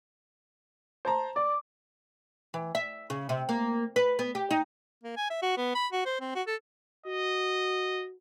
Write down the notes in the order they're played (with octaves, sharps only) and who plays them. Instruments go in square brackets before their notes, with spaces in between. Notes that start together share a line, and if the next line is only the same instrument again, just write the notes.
[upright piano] C5 A5 A#5
[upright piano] D5 [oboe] D6
[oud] E3
E5
C#3
C3
A#3
B4
B3
G4
D#4
[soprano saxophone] A#3
G#5
E5
F#4
B3
B5
F#4
C5
C4
F#4
A4
[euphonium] F#4 [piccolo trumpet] D#5